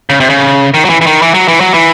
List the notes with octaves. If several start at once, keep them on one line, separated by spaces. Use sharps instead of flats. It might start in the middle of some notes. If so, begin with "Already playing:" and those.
C#3
C3
C#3
D#3
F#3
E3
E3
D#3
E3
F#3
E3
F#3
E3